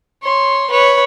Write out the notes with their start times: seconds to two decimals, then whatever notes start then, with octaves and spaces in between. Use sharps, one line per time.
0.23 C#5 C6
0.70 B4 C#5